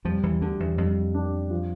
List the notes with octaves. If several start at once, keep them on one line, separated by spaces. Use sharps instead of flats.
F2 F3 G3
E2 E3
D2 D3 D4 G4
E2
F2 G3
D4 G4
F3